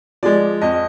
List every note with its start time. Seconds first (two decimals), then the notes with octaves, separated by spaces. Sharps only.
0.23 F3 G#3 D5
0.61 F2 D#5